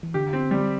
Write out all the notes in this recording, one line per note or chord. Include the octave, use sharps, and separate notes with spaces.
E3
D3 G4
C4
G3